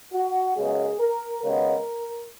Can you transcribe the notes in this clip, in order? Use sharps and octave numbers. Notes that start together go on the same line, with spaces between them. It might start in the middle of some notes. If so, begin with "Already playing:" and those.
F#4
F#2 C#3 G#3 B3 G#4
A#4
D#2 C#3 G#3 B3 A#4